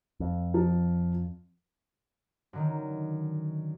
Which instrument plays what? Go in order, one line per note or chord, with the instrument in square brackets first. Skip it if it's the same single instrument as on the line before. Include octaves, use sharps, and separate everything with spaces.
[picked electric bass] F2
[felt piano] F3
[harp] F#2 D3 D#3